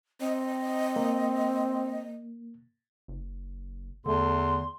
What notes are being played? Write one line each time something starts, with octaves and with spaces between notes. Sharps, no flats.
C4 D#5
A#3
F#1
E2 D3 A3 C6